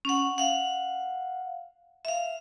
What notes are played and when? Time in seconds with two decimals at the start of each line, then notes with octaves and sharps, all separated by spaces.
0.05 C#4 F#5
0.38 F5 F#5
2.05 E5 F5